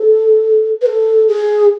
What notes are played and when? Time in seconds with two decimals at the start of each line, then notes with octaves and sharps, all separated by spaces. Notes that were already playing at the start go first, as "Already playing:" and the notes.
Already playing: A4
0.81 B4
0.86 A4
1.28 G#4